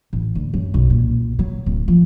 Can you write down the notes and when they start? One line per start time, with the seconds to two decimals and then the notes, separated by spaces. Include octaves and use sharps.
0.13 A1
0.35 D2
0.54 F#2
0.74 B1
0.90 A#2
1.39 F#3
1.66 D1
1.88 F3